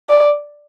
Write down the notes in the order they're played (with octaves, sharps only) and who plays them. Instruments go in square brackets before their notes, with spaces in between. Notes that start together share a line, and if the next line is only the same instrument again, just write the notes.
[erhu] D5